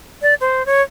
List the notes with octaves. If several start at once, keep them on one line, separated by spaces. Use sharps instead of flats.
D5
C5
C#5